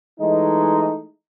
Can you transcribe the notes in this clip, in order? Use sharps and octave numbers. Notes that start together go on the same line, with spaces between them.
E3 G#3 A3 D#4